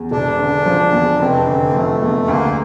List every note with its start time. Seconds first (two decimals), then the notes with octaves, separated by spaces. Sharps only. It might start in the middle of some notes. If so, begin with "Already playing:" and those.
Already playing: E2
0.11 E1 D4
0.39 D3
0.65 F3
0.93 E2
1.20 F1 C4
1.46 D3
1.69 A#3
1.74 F3 A3
2.01 E2
2.28 D2 A#3